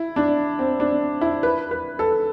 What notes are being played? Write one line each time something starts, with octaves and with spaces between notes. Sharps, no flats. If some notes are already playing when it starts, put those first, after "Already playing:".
Already playing: E4
D4
C4
D4
E4
B4
B4
A4